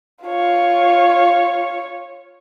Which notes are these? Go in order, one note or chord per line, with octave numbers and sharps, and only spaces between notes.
F4 C#5